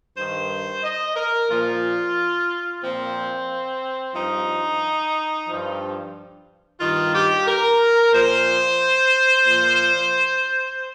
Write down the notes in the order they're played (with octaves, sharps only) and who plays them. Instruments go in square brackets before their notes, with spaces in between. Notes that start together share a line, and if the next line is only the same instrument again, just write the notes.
[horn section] G2 D#3 C5
D#5
A#4
A#2 F3 F4
A#2 F3 C4
G2 F3 D#4
G2 F3
G2 D#3 F4
G4
A#4
A#2 F3 C5
A#2 F3